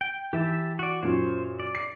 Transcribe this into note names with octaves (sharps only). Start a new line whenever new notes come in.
G5
E3 G4 E5 A5
F#4 D5
F#2 A#2 C5 C#5
D5
C7